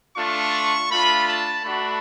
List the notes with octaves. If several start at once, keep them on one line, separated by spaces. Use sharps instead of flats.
A3 D4 F4 C#6
A3 D4 F4 B5
A5
A3 D4 F#4 B5